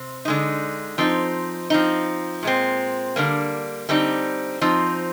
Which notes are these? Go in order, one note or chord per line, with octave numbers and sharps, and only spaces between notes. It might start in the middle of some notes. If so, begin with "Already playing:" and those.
Already playing: C3 C4
D3 G#3 D#4
F3 C4 D#4
F3 C4 D#4
A#2 G#3 C4
D3 G3 A#3
D3 G3 C4 D#4
F3 C4 D#4